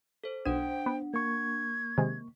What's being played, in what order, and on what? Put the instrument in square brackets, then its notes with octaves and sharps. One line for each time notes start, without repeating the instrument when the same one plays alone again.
[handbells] A4 C5
[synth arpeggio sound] B1 D#7 [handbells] D4 F#5 [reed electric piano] C5 [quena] G5
[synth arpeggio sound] B3
[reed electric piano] A#3 C#6 [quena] G#6
[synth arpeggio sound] C3 D#3 G#3